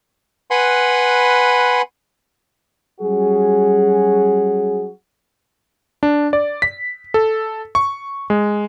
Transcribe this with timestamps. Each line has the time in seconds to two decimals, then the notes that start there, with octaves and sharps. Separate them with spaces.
0.51 B4 F#5 G#5 B5 C6
3.01 F#3 G3 C#4 F#4 G#4
6.03 D4
6.33 D5
6.62 B6
7.14 A4
7.75 C#6
8.30 G#3